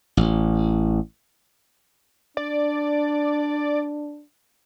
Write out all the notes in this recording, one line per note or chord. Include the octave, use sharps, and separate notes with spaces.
A1
D4 D5